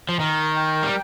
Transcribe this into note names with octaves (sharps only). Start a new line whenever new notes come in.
F3
D#3 A#4
G5
G3